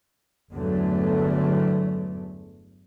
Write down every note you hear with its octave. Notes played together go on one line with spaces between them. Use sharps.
G1 E2 D3 F#3 A3